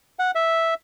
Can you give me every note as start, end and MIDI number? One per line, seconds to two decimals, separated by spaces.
0.19 0.31 78
0.35 0.74 76